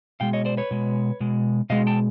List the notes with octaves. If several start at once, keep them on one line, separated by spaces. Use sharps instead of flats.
B2 G#3 F5 G5
C#5 D#5
C5 D5
B4 C#5
B2 G#3
B2 G#3
B2 G#3 D#5 F5
G5 A5